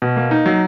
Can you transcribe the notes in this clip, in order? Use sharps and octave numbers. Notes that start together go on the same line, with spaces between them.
B2
A#3
D#4
F#3